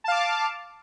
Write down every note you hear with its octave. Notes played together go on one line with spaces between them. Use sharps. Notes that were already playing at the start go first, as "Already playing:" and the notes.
F5 A5 D6